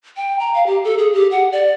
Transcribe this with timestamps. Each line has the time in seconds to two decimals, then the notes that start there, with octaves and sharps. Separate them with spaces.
0.17 G5
0.39 A#5
0.54 F5
0.66 G4
0.84 A4
0.98 G#4
1.13 G4
1.31 F#5
1.52 D5